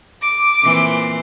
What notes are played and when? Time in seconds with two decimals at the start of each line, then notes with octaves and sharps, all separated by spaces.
0.22 D6
0.62 A#2 E3 C4